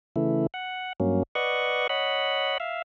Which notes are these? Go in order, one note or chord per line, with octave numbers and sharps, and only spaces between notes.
C#3 E3 A3 E4
F#5
G2 F#3 A#3 C#4
B4 D5 D#5 F#5 C#6
C#5 D#5 F#5 B5
E5 F5